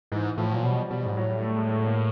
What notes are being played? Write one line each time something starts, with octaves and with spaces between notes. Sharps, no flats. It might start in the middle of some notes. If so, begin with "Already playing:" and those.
G#2 E3
E3
A2 F3
A#2 F#3
B2 G3
B2 G3
G#2
A2 F#3
G3
A3
G#3
A3
A#3